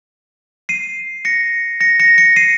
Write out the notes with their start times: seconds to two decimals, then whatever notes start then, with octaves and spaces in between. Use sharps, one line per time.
0.69 C7 D#7
1.25 A#6 C#7
1.81 A#6 C#7
1.99 A#6 C#7
2.18 A#6 C#7
2.36 C7 D#7